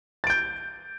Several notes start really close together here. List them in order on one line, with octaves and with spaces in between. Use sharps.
A6 D7 G6